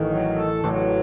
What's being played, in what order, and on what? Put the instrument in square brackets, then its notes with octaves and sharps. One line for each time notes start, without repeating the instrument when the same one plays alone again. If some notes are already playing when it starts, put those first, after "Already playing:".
Already playing: [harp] A1 A2 [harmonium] D#3
[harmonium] F#3
A4
[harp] A1 A2 [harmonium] F#3